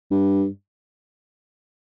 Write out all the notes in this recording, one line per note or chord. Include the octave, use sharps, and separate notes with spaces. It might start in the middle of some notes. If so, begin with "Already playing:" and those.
G2